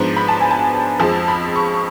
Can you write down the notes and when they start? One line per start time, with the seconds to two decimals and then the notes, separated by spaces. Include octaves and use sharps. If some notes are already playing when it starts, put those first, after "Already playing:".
Already playing: G#2 F3 B3 D4
0.17 B5
0.28 A5
0.40 G#5
0.51 A5
1.00 F2 F3 G#3 A5
1.28 B5
1.56 C#6